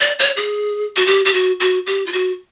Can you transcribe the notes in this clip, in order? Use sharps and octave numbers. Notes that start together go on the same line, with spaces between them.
D5
C#5
G#4
F#4
G4
G4
F#4
F#4
G4
F4
F#4